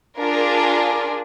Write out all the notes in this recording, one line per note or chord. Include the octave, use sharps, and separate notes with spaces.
D4 F4 G#4 A#4